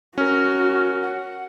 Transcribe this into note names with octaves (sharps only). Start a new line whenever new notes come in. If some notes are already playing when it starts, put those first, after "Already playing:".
C#4 F#4 A#4 F6
F#5